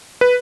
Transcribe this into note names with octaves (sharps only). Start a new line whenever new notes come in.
B4